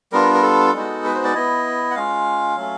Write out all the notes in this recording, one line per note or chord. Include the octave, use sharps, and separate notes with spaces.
G3 B3 D4 F4 A#4
A#4
A4
G#3 B3 D#4 F#4
B4
C5
D5
B3 E4 D#5
F#5
G#3 C#4 F4 F5
F#3 A3 C#4